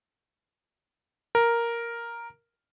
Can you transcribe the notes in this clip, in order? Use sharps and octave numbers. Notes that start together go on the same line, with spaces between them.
A#4